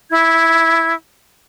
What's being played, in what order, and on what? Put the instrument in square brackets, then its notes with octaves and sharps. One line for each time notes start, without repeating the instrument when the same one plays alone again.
[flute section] E4 G#6